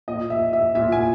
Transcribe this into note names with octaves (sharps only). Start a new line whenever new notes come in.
A#2 D#5
E5
E5
A#2 E5
G#5